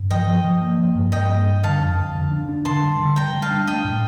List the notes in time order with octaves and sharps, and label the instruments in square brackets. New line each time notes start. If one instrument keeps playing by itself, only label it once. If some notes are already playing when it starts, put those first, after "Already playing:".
Already playing: [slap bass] G2
[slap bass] F3 [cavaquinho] D#5 G5
[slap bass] F3
F3
A#3
F3
G2
[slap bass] G2 [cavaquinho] D#5 G5
[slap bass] A#3
G2
[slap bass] D3 [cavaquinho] F5 A5
[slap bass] F2
F2
D3
D4
D4
[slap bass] D3 [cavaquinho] A5 C6
[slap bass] G3
D3
[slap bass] G3 [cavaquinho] G5 A#5
[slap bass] G3
[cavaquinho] F5 A5
[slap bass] D4
[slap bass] A3 [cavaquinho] D#5 G5
[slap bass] A2